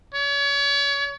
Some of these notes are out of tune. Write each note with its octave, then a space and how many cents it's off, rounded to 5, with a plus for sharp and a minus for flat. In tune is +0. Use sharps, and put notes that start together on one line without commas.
C#5 +35